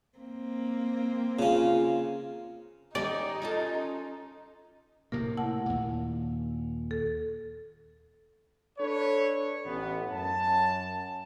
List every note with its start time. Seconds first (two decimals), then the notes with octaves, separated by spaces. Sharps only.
0.18 A#3 C4
1.39 C#3 C#4 F4
2.95 D#4 G4 D5 D#5 G#5
3.42 C#4 F4 A4
5.12 A2 C3 A#3 A#4
5.37 E4 F#5 A5
5.66 D#2 A#2
6.91 A4
8.79 D4 A4 B4 C#5
9.65 A1 B3
10.12 F#2 A5